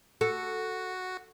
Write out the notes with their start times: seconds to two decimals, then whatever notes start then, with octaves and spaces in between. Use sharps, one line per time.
0.21 F#4 A4